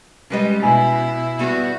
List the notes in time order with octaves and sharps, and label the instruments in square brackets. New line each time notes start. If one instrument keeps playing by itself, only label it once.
[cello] G3 G#3 [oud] C#4 B4 D#5
[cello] B2 [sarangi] E4 [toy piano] G#5
[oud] G3 B3 G#4 [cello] F#4